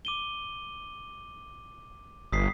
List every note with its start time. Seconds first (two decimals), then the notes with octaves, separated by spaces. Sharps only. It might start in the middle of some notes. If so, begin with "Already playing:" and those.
0.05 D6 D#7 G7
2.32 G1 D#6 B6 C7